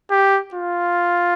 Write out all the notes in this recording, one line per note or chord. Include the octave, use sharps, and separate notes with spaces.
G4
F4